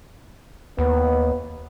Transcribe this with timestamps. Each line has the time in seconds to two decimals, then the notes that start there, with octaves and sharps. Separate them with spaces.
0.79 D#2 B3